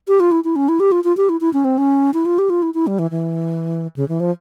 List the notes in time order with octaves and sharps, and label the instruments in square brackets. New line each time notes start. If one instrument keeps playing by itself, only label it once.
[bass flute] G4
F4
E4
E4
C#4
E4
G4
F4
F4
G4
E4
E4
C#4
C4
C#4
E4
F4
G4
F4
E4
E4
G3
E3
E3
C#3
E3
F3